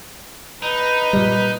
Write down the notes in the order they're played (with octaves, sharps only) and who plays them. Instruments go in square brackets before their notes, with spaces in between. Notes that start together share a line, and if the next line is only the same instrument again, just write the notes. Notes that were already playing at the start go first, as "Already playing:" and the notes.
[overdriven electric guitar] D#4 [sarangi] B4
[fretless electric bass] A#2 G3